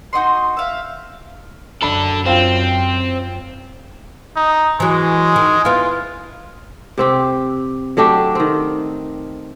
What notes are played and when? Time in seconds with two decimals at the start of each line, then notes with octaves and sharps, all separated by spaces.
0.13 D#4 F#4 D#5 C6
0.57 E5 F5
1.83 F#2 D4 A4 B5
2.27 C4 F4 G5
4.37 D#4
4.80 E3 F#3 G#3
5.36 D#3
5.65 B3 E4 F4
6.98 C3 C4 G4
7.97 F#3 A3 D4 G4
8.35 D#3 C4